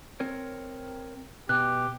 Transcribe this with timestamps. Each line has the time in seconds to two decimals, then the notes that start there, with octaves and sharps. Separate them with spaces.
0.20 C4 A#4 C#5
1.49 B2 G4 F#6